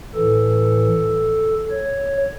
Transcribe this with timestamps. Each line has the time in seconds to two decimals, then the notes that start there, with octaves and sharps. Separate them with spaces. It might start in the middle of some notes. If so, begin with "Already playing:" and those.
0.15 A2 E3 A4
1.71 C#5